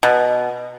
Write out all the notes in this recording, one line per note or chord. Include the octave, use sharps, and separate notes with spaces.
B2